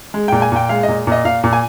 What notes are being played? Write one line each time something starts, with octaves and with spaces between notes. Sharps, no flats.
G#3
A#2 G5
G#5
A#2 G5
G#3 F5
D#5
A#2
A#2 D#5
A#2 F5
A#2
G#5